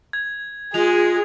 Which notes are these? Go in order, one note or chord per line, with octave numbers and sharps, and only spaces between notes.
G#6
G#3 F4 G#4 F7